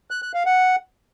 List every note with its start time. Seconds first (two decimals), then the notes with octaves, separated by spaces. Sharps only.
0.11 F#6
0.22 F#6
0.34 F5
0.46 F#5